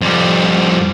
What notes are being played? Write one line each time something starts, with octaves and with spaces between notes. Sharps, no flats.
F2 G3